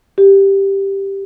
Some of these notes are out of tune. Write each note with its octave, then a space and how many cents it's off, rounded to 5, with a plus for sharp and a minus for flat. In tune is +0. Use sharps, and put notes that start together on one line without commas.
G4 +0